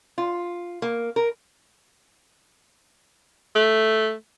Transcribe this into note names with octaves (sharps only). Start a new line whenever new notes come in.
F4
A#3
A#4
A3